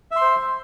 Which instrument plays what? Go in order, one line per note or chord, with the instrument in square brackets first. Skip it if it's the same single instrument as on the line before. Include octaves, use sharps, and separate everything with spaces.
[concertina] E5
C6
C5